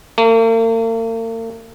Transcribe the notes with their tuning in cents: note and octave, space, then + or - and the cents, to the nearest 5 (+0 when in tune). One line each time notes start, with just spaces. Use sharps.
A#3 -45